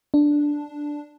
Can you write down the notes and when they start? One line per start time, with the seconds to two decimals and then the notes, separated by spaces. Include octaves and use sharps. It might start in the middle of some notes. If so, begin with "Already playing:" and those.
0.14 D4